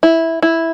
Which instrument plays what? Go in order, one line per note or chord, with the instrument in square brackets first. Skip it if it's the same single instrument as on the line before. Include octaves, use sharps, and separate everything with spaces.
[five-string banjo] E4
E4